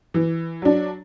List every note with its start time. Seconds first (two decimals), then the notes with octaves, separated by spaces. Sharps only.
0.14 E3
0.62 F#3 D4